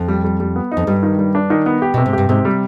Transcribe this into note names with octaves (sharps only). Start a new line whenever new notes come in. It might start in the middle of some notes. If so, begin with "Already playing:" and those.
Already playing: F2
G3
G3
G3
B3
D#4
F2
G2 G3
D#3
G3
D4
D#3
B3
G4
B2
C3
G#2
G2 G4
G#2 C3
G3